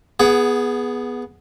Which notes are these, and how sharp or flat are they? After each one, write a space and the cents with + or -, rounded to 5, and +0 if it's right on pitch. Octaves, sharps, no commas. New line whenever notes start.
B3 -10 G#4 +0 F#5 +15